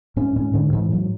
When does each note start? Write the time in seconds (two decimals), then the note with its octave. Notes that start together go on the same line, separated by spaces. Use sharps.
0.16 G#2 C#4
0.36 G#2 C#4
0.54 G#2 D3
0.73 G#2 E3
0.92 G#2 F#3